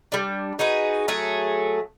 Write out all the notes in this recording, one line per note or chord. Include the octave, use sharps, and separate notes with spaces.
G3 D4
D#4 F#4 G#4 B4
F#3 A3 G#4